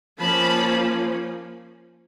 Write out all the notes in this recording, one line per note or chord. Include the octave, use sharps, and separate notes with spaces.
F3 A#3 C#4 A5 B5